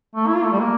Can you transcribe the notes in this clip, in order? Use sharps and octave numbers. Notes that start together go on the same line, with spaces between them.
A3
E4
F4
A3
G3
A#3